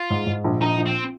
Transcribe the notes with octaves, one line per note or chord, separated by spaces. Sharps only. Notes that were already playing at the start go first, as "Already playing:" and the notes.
Already playing: F4
G#2
G#2
A#1
A#1 D#4
A#1
C4